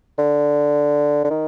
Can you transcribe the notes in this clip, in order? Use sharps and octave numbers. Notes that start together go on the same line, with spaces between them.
D3
D3
D#3